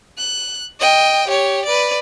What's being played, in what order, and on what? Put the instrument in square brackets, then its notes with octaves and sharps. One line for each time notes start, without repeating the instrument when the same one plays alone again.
[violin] F#6
D#5 G5
G4 C#5
B4 D5